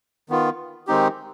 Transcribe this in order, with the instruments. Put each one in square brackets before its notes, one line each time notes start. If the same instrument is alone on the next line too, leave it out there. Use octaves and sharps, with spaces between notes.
[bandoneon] D#3 B3 F4
D#3 G#3 C4 D#4 G4